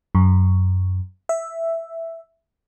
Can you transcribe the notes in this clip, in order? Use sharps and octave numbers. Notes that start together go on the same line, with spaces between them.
F#2
E5